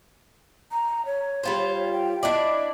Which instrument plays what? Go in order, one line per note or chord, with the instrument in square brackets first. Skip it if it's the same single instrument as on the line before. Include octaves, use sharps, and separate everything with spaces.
[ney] A#5
C#5
[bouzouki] G3 F4 C5
[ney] G5
[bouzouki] D4 E4 D5 [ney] D#5